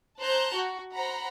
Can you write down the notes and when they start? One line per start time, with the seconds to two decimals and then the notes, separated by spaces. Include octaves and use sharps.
0.19 C5 A5 A#5 F#6 G6
0.55 F#4
0.93 C5 F#5 A#5 B5